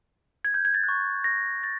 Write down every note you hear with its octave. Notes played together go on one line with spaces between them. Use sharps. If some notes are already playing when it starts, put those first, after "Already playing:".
G#6
G6
G#6
A6
F#6
C#6
A#6
A6